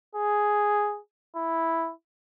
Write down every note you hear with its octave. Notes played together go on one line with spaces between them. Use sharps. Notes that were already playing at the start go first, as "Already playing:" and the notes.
G#4
E4